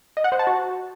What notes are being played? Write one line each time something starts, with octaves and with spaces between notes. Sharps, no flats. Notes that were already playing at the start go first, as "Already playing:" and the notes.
D#5
F#5
C5
A5
F#4